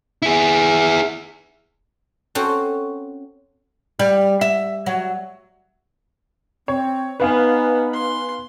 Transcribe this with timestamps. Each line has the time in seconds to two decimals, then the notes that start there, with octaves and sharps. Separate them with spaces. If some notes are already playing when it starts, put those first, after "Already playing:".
0.22 E4 G#4
2.35 C4 C#4 F#4 A4 C5
3.99 G3
4.41 E5
4.86 F#3
6.68 C4 C#5
7.20 B3 D#4 B4 F5 G#5
7.93 C6